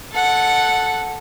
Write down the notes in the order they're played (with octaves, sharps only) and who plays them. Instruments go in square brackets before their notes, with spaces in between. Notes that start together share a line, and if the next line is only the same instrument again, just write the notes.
[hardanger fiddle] A4 F#5